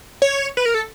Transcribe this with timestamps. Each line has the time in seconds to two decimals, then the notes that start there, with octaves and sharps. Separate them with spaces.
0.22 C#5
0.57 B4
0.66 A#4
0.74 A4